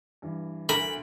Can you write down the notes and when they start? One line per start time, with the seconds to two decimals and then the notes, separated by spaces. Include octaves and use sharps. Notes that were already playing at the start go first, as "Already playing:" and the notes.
0.22 G2 E3
0.69 D2 A#4 B5